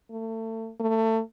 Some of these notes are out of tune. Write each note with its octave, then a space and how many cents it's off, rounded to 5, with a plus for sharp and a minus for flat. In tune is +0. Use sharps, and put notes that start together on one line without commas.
A3 +30
A3 +25